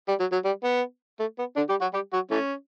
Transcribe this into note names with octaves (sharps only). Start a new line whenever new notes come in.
G3
F#3
F#3
G3
B3
A3
B3
D3 D4
G3 G4
F#3 F#4
G3 G4
F#3 F#4
E3 A3 C#4